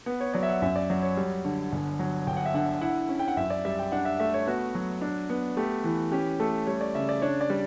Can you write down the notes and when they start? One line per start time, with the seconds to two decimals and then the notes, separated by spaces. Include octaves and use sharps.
0.06 B3
0.20 C#5
0.34 F#3 D5
0.43 E5
0.49 F#5
0.62 F#2 E5
0.76 D5
0.90 F#3 D5
1.02 C#5
1.17 G3
1.45 D3
1.72 G1
1.99 F#3
2.27 G1 G5
2.37 F#5
2.46 E5
2.54 D3 F#5
2.81 E4 F#5
3.09 C#4
3.19 G5
3.28 F#5
3.37 F#2 E5
3.50 D5
3.65 G3 E5
3.79 G5
3.92 D4 F#5
4.05 E5
4.20 A3 E5
4.34 C#5
4.47 B3 F#4
4.75 F#3
5.02 D4
5.29 B3
5.57 A3 G4
5.84 E3
6.12 C#4 G4
6.40 A3 A4
6.67 G3 C#5
6.81 D5
6.95 C#3 E5
7.09 D5
7.22 D4 C#5
7.41 D5
7.50 G3